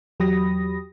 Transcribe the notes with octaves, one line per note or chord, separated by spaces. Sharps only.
E2 F#3 G4 B5 D#6 A#6